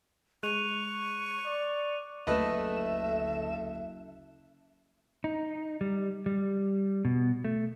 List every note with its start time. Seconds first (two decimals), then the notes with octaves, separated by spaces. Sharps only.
0.43 G#3 C#6 F#6 D#7 F7
1.46 D5
2.27 F#1 D2 A3 A4 B4 D#5 E5 E7
5.24 D#4
5.81 G3
6.26 G3
7.05 B2
7.45 A3